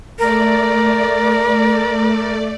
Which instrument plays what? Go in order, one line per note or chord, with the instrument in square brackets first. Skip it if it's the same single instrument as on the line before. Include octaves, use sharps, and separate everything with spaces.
[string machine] A3 D5 [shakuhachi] A#4